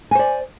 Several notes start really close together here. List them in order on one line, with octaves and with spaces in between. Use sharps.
G#5 C5 D5